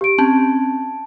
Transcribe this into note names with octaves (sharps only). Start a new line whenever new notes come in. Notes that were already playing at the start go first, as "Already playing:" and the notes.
G4 D7
C4 C#4 A5